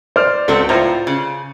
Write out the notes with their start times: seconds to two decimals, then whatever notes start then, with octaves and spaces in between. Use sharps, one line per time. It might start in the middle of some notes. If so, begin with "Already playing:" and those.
0.16 C5 D5 F6
0.48 C#2 C4 F#4 A4
0.69 A2 F4 C5 A#5
1.07 C#3